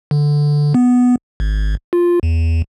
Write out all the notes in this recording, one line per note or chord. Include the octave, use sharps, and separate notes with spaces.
D3
B3
G#1
F4
E2